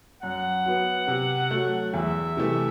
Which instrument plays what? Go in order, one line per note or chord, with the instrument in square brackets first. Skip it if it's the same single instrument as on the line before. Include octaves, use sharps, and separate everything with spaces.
[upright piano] F#2 [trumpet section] F#5
[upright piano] F#3 B3
C3
F#3 A3
[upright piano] E2 [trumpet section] E5
[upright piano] C3 E3 A3